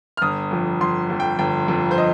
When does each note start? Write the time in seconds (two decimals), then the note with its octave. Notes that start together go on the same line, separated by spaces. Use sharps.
0.17 F6
0.22 G1 D#6
0.51 F2 F3
0.81 G1 C6
1.10 F2 F3
1.20 G5
1.39 G1 G5
1.68 F2 F3
1.91 C5
1.98 D#5